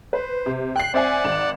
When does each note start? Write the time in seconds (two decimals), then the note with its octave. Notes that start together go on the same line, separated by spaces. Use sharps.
0.13 B4 C5
0.46 C3
0.76 G5 F#6 C7
0.94 C4 D5 E5 F#5 G#5
1.24 G#1 E7